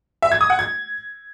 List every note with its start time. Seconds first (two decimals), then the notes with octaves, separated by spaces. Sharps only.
0.22 E5
0.32 G#6
0.41 D#6
0.50 F#5
0.59 G#6